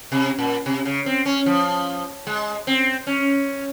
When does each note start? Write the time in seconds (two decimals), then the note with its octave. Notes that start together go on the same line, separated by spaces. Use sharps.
0.12 C3
0.39 A#2
0.66 C3
0.85 C#3
1.06 C4
1.26 C#4
1.46 F3
2.27 G#3
2.67 C4
3.07 C#4